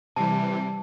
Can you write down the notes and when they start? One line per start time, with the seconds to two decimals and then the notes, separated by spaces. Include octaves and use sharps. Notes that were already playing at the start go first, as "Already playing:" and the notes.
0.16 C3 E3 G3 A5